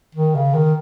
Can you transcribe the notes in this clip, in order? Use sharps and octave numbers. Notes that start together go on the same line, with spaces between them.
D#3
C#3
D#3